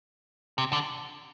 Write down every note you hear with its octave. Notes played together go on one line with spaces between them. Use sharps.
C3
D3